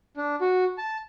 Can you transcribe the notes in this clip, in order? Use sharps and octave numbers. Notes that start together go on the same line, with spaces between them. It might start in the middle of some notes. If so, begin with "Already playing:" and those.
D4
F#4
A5